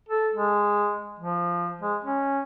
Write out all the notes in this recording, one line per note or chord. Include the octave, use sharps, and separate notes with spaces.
A4
G#3
F3
G#3
C#4